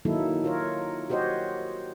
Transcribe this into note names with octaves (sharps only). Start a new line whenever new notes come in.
D#3 F#3 A#3 D#4 E4 A4
F4 A#4 C#5
F#4 G4 C5 C#5 D#5